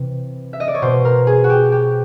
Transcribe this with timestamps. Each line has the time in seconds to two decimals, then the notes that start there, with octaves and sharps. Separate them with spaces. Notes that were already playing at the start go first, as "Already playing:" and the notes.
Already playing: C3 E3
0.53 E5
0.60 D#5
0.68 D5
0.75 C#5
0.82 B2 C5
1.05 A#4
1.27 G#4
1.44 F#4
1.50 G4
1.72 G4